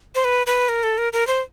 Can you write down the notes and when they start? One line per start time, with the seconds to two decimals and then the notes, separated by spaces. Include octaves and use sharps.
0.15 C5
0.24 B4
0.47 B4
0.69 A#4
0.83 A4
0.98 A#4
1.13 A#4
1.27 C5